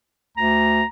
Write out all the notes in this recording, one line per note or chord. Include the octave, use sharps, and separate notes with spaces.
D2 A#5